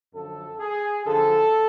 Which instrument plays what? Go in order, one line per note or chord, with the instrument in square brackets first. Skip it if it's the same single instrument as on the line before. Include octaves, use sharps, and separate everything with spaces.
[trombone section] F#2 D3 F3 A4
G#4
F#2 D3 F3 A4